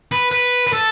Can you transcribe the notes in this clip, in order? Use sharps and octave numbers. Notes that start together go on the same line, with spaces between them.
B4
B4
B4
A4